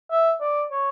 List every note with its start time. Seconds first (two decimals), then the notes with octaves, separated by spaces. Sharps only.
0.12 E5
0.41 D5
0.71 C#5